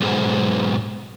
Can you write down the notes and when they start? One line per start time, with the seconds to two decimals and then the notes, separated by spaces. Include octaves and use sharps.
0.01 B1 G#2